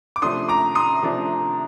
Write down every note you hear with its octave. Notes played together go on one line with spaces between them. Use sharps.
D6
C3 F3 A3 D4 C6 D#6
A#5 D6
C6 D#6
C3 F3 A3 D4